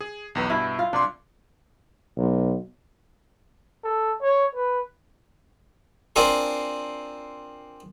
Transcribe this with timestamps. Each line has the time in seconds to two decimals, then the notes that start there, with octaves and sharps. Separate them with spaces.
0.01 G#4
0.35 B1 E2 B4
0.50 G2 B2 E4
0.79 F4
0.93 C2 D4 C6
2.17 B1
3.84 A4
4.22 C#5
4.55 B4
6.16 C4 D4 F4 G#4 A#4